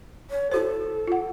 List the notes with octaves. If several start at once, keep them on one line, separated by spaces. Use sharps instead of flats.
C#5
E4 F#4 A4 C5
F4 F#5